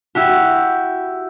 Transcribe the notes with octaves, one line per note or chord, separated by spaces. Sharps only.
E4 F#4 G4